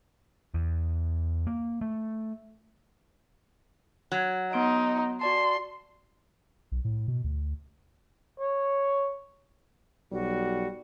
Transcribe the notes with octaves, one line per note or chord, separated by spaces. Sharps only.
E2
A#3
A3
F#3
B3 D#4 C6 D7
F#4 D5 A5 C6
B1
A2
B2
D2
C#5
B1 G3 F#4